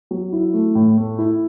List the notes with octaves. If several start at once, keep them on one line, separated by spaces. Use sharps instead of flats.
F#3
E4
A3
A2
A3
E4